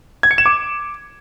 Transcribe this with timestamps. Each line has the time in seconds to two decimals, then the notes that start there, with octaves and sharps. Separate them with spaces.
0.23 G#6
0.31 C#7
0.38 E7
0.46 D6